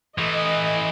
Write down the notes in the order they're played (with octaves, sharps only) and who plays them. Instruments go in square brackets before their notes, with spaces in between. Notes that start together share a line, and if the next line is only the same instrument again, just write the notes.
[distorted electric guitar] E3 A3 [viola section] D#5